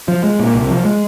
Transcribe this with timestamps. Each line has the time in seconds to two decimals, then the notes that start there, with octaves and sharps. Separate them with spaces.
0.08 F3
0.24 G#3
0.39 A#2
0.54 C2
0.70 F3
0.85 G#3